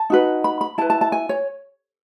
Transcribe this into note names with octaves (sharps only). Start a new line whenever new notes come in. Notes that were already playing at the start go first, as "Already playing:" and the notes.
Already playing: A5
D#4 F#4 B4
B5
B5
E4 B4 A5
A5
A5
G#5
C#5